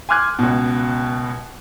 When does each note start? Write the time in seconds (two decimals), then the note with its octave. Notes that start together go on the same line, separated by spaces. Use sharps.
0.09 G#5 C6 D6 F6 F#6 G#6
0.39 C#2 B2